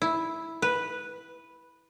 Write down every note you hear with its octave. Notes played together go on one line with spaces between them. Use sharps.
E4
B4